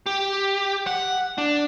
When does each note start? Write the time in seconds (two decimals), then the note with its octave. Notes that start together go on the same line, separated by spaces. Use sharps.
0.06 G4
0.87 F#5
1.38 D4